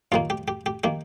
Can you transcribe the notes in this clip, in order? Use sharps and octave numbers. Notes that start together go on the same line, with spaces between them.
D#2 D#3 A#3 F4
G4
G4
G4
D#3 A#3 G4